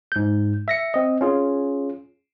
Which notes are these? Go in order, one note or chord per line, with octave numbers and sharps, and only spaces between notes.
G#2 G6
E5 A#6 C#7
C4 D#5
C#4 F4 G#4